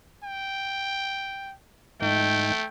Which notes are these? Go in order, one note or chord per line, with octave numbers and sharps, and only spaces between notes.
G5
G#2 A3 D#4 G5